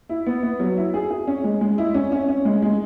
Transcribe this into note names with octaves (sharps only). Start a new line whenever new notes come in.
E4
B3
B3
F#3
E4
G#4
G#4
C#4
G#3
G#3
E4
C#4
C#4
C#4
G#3
G#3